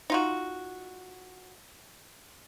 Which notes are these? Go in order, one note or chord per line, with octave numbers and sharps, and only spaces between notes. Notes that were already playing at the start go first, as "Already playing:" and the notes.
D#4 F4 F#4